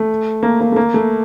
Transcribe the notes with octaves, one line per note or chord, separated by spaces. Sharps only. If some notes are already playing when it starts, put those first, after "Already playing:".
Already playing: A3
A#3
A#3
A3
A#3
A3